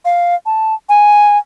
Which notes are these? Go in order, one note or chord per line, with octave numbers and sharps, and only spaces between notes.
F5
A5
G#5